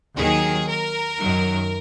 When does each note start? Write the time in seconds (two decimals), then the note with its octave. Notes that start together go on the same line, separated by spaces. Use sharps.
0.16 D#2 D#3 F#3 G#4
0.67 A#4
1.19 F#2 D#3 F#3